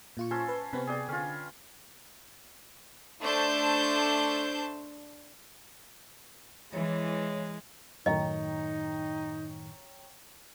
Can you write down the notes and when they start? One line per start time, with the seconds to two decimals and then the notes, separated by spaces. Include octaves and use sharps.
0.17 A#2 F4 C#6
0.31 C#4 A4 C5
0.48 B4
0.73 C3 B3 C4 B4 C#6
0.87 G#4 D5 G5
1.09 D3 C#4 F4
3.21 A3 D4 C5 A5 G6
6.73 E3 G#3 C#5
8.06 F#2 A2 D#3 D#4 C#5 D#5 G5 A#5